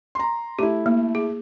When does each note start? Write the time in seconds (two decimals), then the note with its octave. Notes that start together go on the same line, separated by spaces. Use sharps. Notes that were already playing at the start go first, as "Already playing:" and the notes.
0.15 A#5 C6
0.59 A3 E4 G4
0.86 A#3
1.15 G#4